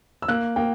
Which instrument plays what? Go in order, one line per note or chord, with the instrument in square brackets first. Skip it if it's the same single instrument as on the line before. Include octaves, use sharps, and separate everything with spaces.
[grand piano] E6
[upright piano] A#3 [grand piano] F#6
[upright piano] A#3 [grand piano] G5